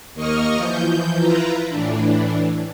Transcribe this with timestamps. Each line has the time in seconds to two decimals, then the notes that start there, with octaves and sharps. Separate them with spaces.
0.15 D#2 A#3 D#5 C#6 D#6 F6
0.56 E3 F3 G6
1.18 E4 F4 B4 A#5
1.69 A2 E3 D4